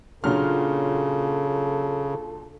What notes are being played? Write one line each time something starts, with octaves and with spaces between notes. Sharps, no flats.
A#2 C#3 F#3 D4 A4 F6